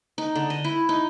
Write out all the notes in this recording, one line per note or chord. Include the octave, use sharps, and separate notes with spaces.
D#4
D3
D#5
E4
D#4